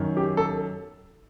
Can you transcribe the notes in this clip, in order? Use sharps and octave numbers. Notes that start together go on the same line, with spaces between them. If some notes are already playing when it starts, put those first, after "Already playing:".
Already playing: F#2 D#3
G4
A4